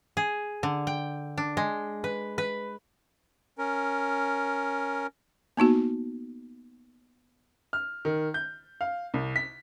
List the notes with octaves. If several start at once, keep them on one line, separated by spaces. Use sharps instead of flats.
G#4
D3
G5
D4
G#3
B4
B4
C#4 A#4
A#3 B3 D#4 F#4
F6
D#3
G6
F5
C2
B6